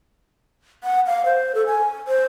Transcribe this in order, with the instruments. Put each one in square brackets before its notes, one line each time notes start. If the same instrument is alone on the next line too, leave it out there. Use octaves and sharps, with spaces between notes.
[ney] F#5
F5
C5
A4
G#5
C5